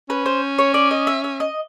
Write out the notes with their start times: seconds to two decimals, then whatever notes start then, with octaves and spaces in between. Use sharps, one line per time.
0.09 C#4 B4
0.26 C5
0.58 C#5
0.74 D5
0.91 D#5
1.07 E5
1.24 E5
1.40 D#5